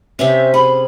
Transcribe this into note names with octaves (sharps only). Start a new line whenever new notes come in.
C3 C4 C#4 E5
G#4 B5